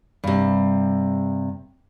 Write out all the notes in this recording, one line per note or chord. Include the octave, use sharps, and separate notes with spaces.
G2 C3